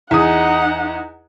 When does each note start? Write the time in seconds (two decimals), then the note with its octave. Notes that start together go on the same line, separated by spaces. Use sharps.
0.11 E2 D#4 G#4 F#5 D#6